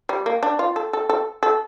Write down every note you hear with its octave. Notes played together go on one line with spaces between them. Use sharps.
G3
A#3
D4
F4
A4
A4
A4
A4